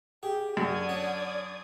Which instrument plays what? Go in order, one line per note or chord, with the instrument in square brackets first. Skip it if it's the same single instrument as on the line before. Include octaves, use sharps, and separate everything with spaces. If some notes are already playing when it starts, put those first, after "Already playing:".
[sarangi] G4 [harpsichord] G#4
[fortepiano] F#2 [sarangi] D3 [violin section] D5 D#6 G#6
[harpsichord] C#4